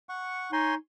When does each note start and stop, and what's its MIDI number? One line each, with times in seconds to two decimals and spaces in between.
0.09 0.51 78
0.09 0.51 85
0.53 0.75 63
0.53 0.75 73
0.53 0.75 80
0.53 0.75 84